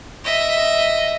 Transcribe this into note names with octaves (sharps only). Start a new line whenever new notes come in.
D#5 E5